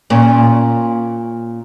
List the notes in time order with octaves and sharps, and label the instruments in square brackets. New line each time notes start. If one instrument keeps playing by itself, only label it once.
[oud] A#2 C#4